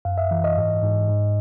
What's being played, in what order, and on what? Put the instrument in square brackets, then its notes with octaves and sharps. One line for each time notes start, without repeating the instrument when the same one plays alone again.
[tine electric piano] F#2 F5
E5
E3
D#5
G#2
G#2
G#2